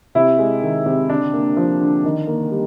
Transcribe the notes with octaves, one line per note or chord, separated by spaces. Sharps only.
C3 E4
G#3
D#3
C3
D3 D4
A#3
F3
D3
D#3
A#3
G3